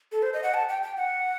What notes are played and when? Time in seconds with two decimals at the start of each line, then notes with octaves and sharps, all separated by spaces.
0.12 A4
0.23 C5
0.33 D#5
0.43 F#5
0.54 A5
0.69 G5
0.83 G5
0.97 F#5